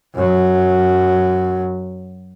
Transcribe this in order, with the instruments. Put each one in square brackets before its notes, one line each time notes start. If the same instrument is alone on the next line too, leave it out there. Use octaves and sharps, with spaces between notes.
[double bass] F#2 F#3